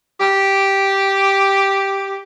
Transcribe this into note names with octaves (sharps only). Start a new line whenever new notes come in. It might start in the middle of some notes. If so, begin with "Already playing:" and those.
G4